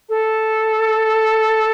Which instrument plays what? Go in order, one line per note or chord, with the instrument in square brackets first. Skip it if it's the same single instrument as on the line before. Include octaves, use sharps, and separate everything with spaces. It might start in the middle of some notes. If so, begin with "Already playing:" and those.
[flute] A4